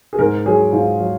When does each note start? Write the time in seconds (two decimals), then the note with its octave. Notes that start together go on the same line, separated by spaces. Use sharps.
0.13 G#4
0.19 G#2 A#4
0.46 F#3 G#4
0.73 G#2 F4
1.00 F#3